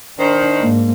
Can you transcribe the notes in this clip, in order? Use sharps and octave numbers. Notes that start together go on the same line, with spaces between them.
D#3 D4 C5
G#2 A#3